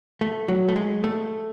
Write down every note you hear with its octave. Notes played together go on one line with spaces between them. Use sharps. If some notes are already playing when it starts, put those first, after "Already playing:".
A3
F#3
A3
G#3
A3